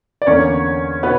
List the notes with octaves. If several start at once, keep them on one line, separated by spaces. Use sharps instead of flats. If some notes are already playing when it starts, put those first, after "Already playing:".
D5
E2 D3 A#3 C#4 C#5
B2 B3 B4